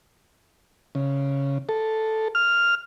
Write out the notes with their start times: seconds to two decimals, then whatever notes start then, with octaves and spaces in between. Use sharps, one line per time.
0.95 C#3
1.69 A4
2.35 F6